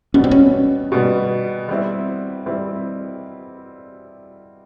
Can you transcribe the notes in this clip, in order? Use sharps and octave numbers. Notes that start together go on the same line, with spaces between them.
B2 G3 B3 C#4
C4
C#4
B2 G3 B3
G3 C4 E4
G3 C4 E4